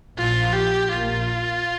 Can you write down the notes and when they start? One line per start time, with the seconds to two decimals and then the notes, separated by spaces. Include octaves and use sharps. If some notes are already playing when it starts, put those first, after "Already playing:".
0.17 A#1 A#2 F3 A#3 F4
0.53 G4
0.90 A#1 A#2 A#3 F4